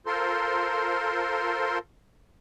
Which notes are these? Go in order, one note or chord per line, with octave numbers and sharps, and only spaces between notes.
F4 A4 A#4 C5 C6